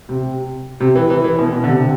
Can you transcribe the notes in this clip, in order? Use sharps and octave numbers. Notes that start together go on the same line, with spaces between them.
C3
C3
E3
E3
E3
B2
B2
D3
C3